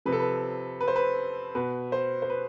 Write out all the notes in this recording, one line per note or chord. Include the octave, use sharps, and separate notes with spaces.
C3 F3 B4
A4
B4
B4
C5
B4
B2 B4
C5
C5
B4